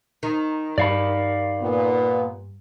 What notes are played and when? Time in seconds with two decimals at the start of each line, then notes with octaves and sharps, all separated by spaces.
0.23 D#3
0.78 G2 D5 F5 B5
1.62 A#2 B3